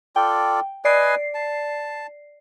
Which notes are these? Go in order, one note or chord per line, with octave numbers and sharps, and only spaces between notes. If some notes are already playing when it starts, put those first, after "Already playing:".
F4 A4 D5 G5
B4 D5 D#5 G#5 C7
A5